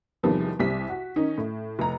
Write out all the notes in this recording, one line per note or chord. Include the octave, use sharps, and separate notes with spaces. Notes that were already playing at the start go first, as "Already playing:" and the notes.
E2 C3 D#3 F3 G3 B3
C2 G3 C4 B6
F#4
D#3 C#4 D#4
A2
F1 A#5